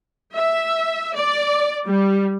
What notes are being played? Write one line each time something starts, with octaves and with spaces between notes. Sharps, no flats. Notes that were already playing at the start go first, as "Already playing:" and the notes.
E5
D5
G3